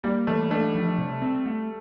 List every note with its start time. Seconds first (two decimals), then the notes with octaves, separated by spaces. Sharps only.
0.04 G3 A#3
0.27 E3 A3
0.51 A3 D4
0.75 F3
0.98 C3
1.22 C4
1.46 A3